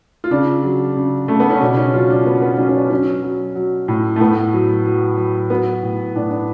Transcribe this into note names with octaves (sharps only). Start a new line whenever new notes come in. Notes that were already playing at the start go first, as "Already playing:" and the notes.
F4
C#3 D4
F#3
C#3
C#3 A3
B3
C#4
B2 D4
C#4
F#3 F4
D4
F#3 B3
B3
F#3 C#4
C#4
D4
F#3 C#4
F#3
F#3
A2
A3
A2 B3
F#3
F#3
F#3
F#3 B3
A2
A2 D4
D4